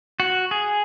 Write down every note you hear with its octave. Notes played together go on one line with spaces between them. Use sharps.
F#4
G#4